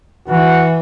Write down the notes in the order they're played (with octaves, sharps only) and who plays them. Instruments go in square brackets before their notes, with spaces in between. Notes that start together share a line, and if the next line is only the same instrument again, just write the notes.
[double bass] E3 [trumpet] F#4